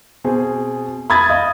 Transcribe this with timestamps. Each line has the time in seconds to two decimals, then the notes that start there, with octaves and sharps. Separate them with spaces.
0.24 B2 C4 G#4
1.10 B5 D#6 G#6 A6
1.29 D#5 F5 D#6